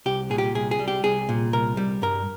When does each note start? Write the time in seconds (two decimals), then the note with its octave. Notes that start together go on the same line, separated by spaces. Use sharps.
0.06 C2 G4
0.30 A#2 G#4
0.38 G4
0.55 C2 G#4
0.71 G#4
0.79 G3
0.88 G4
1.04 C2 G#4
1.29 A#2
1.53 C2 A#4
1.77 G3
2.02 G2 A#4